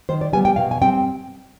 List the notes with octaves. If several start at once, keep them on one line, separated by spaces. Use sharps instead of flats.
D#3 C5
D5
G3 B3 G#5
G5
B2 F5
G#5
G3 C4 G5